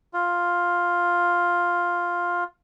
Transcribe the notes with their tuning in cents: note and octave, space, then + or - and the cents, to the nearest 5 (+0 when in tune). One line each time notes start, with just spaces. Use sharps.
F4 +5